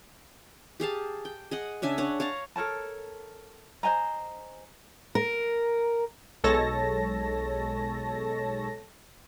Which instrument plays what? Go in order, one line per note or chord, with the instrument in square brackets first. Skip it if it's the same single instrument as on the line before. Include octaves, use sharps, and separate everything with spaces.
[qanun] G4 G#4 F5 A5
G5
G#4 D#5 F#5
C#3 D4 E5 G#5
D4 C#5 F#5
C#5 F5 A5 A#5
[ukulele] A4 A#4 C#5 A5
C5 D#5 G#5 A#5
[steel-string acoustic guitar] A#4
[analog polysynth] B1 G#3 A4 C#5 A5 A#6